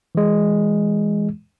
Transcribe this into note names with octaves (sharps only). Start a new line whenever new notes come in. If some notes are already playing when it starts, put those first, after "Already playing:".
E3 G#3